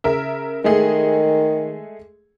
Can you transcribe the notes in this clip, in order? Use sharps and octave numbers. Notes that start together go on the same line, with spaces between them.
C#3 A#4 E5
D#3 G#3 A3 G#4